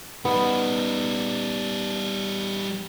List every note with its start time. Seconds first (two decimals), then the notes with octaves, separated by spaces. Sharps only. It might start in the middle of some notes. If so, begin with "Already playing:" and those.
0.25 G3 B3 D#4